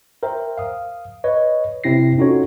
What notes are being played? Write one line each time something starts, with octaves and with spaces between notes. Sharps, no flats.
A#4 C5 E5 G5
F5 D#6
B4 C#5 D#5
C3 C4 E4 A#6 C7
C#4 D#4 F4 F#4 A4 C#5